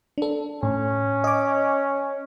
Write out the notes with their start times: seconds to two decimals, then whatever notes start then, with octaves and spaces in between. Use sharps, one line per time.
0.18 D4 A4
0.63 A2 C#4
1.24 D#5 D6